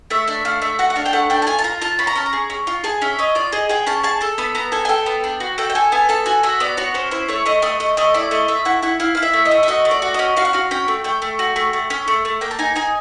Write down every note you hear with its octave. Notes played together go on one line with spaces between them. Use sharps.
A3 E5
D4 E5
A3 F5
A3 E5
F#4 F#5
F#5
D4 F5
G5
A3 F#5
D4 G5
A5
F4 G#5
A5
F4 A#5
F4 A5
C#4 B5
A#5
C#4 A5
A#5
G#4
C#4
F4
G#4 A5
C#4 E5
C#4 D#5
F4 D5
G#4 D#5
G#4 G5
C#4 A5
G#4 A5
A4 A5
B3 B5
B3 A#5
A4 G#5
G#5
A4 G5
B3
D4
F#4
A4 G5
G5
A4 G#5
B3 G#5
A4 A5
F#4 G#5
F#4 E5
B3 D5
F#4 C#5
C#4 C5
E4 C5
A3 C#5
A3 D#5
A3 D#5
A3 D#5
A3 D#5
E4 D5
A3 D#5
A3 E5
E4 F#5
E4 F#5
E4 F5
E4 F5
E5
A3
D#5
A3
E5
F#4 D#5
A3
D5
F#4
C#4 D#5
F#4 F5
F#5
F#4 F5
C#4 G5
A3
A3 G5
A3
F#4
A3
A3
C#4
A3
A3
A#3 G5
A5
D#4 G#5
D#4 G#5